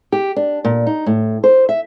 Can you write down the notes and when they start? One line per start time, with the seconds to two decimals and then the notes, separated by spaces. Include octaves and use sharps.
0.12 G4
0.36 D4
0.65 A#2
0.87 D#4
1.06 A2
1.44 C5
1.69 E5